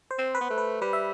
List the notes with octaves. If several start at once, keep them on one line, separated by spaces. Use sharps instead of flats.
C5
C4
B4
B3
A3
B4
G3 B4
E5